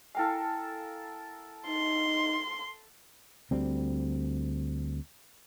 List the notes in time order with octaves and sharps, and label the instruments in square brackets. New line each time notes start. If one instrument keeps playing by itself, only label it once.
[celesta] E4 G5 G#5 [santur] A4 A#4 F5
[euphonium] D#4 [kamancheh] C6
[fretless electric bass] D2 G3 C4